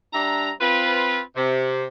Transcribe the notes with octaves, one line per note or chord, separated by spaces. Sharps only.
G3 D4 E5 A#5
C4 F4 B4
C3